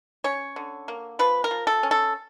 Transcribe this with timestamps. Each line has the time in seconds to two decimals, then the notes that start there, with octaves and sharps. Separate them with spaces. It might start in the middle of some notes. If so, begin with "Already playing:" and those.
0.24 C#4 C#5
0.56 D3
0.88 A#3
1.19 F3 B4
1.44 A#4
1.51 F3
1.67 A4
1.83 C#4
1.91 A4